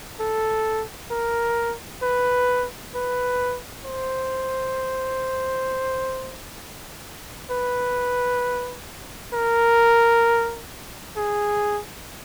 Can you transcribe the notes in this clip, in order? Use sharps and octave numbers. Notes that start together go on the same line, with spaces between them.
A4
A#4
B4
B4
C5
B4
A#4
G#4